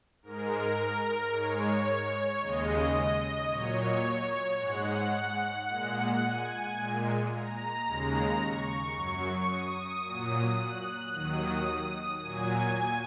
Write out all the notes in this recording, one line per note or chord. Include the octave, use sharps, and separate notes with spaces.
G#2 G#3 A#4
G#2 G#3 C#5
D#2 C#3 G#3 D#5
A#2 F#3 C#5
G#2 G#3 F#5
A#2 G#3
G#5
A#2 G#3
A#5
D#2 C#3 G#3
C#6
F#2 F#3
D#6
A#2 F#3
F#6
D#2 D#3 F#3 D#6
A#2 F#3 G#5